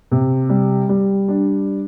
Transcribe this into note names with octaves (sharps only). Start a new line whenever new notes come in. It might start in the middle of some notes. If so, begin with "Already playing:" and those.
C3
G3
G3
D4